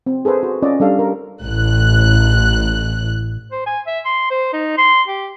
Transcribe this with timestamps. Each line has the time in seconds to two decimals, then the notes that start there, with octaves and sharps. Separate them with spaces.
0.06 C4
0.25 G#4 A4 B4 C5 G#5
0.43 F#4
0.62 C#4 F4 D5 D#5
0.80 G3 D4 A4 F5
0.99 A#4
1.42 A1 F#6
3.51 C5
3.66 G#5
3.87 E5
4.05 C6
4.30 C5
4.53 D#4
4.78 C6
5.08 G4